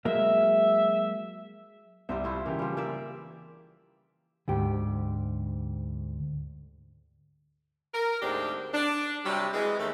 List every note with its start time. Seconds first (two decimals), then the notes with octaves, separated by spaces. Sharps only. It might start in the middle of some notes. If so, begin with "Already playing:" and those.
0.05 F#3 G#3 A#3 E5
2.09 C2 G3 C4 E5
2.24 A3 E4 F4
2.46 C#3 E3 A#3 G4
2.59 F3 G3
2.77 A#3 D5 E5
4.48 D2 G#2 G4
7.94 A#4
8.22 D2 G#2 C4 D4 G4
8.74 D4
9.25 C3 F#3 G3
9.54 E3 G#3
9.78 D#2 A3